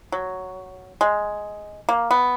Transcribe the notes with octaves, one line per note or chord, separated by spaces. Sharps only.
F#3
G#3
A#3
B3